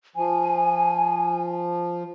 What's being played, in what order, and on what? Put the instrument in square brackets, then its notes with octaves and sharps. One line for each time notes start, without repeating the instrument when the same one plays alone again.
[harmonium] F3 [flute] G#5